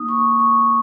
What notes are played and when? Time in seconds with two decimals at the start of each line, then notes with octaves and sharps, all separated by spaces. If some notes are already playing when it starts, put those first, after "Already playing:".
Already playing: A#3 D#4 D#6
0.08 C#6
0.40 C#6